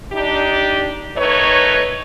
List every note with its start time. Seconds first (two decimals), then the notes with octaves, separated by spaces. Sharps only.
0.12 D4 D#4 G4
1.16 D#3 A3 D#4 B4 C#5